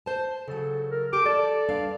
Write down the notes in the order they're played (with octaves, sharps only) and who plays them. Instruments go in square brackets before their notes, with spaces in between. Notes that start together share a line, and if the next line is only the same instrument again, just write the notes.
[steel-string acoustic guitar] C5 A5
[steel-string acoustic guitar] C#3 F#3 [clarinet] A4
[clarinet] A#4
[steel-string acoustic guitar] G4 A4 [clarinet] D6
[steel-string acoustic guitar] A4 A5 [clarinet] D5
[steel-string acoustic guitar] G2 D4 F5